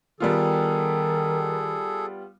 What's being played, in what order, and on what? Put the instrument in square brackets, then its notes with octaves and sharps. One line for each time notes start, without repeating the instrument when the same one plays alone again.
[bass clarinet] D#3 [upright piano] G3 B3 F4 [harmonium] G#4 A4